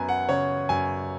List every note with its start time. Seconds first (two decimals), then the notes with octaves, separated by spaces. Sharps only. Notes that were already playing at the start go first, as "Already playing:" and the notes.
Already playing: F#2 B3 G#5 A#5
0.09 F#5
0.29 C#3 C#5
0.69 F#2 G#5